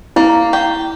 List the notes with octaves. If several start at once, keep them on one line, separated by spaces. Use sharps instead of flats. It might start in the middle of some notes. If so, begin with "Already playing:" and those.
A#3 E4
G4